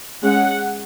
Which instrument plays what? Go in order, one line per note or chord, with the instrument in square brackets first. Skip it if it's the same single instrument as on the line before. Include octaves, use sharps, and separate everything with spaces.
[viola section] G#3 C#4 F#5